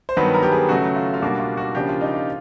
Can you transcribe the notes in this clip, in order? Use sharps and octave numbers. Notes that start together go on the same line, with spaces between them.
C5
G2 D#3 F#3 B3 B4
A#4
G4
G#4
C#3 F#3 A3 F#4
F4
F4
B2 G3 A#3 D4 F#4
F4
F#4
C#3 F3 A#3 D4 G4
F4
D#4
F4